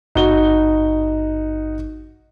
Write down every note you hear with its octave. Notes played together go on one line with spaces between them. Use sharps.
G#1 G2 D#4 F#4 G7